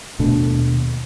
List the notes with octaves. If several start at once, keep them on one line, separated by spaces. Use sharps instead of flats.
D#2 B2 A3 D4